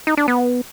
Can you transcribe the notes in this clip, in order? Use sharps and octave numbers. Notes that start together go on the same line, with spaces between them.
D#4
D4
B3